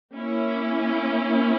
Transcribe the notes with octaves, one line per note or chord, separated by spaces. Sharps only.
A#3 C#4 E4